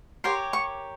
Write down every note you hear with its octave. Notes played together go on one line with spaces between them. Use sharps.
G4 A#4 C#5 C6
C#6